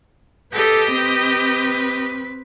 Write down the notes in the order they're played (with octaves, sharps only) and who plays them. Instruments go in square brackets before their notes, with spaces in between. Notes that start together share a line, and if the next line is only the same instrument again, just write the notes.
[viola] G4 D#5 [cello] A4 B4
[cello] C4 B4